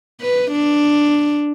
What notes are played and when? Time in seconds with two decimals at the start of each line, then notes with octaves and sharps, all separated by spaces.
0.21 B4
0.52 D4